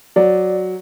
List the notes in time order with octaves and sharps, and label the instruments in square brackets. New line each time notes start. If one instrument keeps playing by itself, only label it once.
[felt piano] F#3 [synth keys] D5